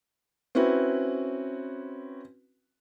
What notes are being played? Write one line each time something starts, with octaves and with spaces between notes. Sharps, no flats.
C4 C#4 E4 F#4 B4